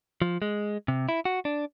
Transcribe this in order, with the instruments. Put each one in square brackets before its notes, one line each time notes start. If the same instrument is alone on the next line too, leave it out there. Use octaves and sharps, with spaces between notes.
[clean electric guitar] F3
G#3
C3
E4
F#4
D4